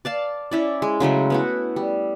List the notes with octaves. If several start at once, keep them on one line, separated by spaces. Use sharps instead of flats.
D5 F5 A5
C#4 E4 D5
G#3
C#3 F#3 G#3 A3
B3 E4 F#4
G3